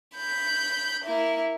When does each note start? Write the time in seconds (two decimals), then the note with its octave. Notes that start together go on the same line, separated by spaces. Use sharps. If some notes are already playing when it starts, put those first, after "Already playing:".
0.17 B5 G6
1.04 A#3 E4